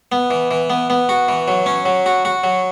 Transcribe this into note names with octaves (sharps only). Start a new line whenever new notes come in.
B3
E3
E3
B3
B3
F#4
E3
F#3
C#4
F#3
F#4
F#4
F#3